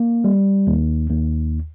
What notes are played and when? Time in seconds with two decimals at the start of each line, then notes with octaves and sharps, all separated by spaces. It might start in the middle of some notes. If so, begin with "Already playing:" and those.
Already playing: A#3
0.24 G3
0.67 D#2
1.10 D#2